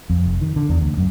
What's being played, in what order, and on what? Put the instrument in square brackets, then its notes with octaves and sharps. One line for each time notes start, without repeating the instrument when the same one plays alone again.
[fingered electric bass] F2
F1
D#3
D3
E2
D2
F#2